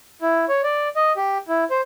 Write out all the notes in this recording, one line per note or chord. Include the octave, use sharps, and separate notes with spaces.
E4
C#5
D5
D#5
G4
E4
C5